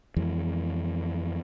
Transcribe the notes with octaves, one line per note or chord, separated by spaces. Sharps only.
F2 E3 G#3